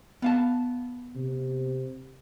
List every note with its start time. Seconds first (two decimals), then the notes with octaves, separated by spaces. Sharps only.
0.22 B3 F5 A5
1.16 C3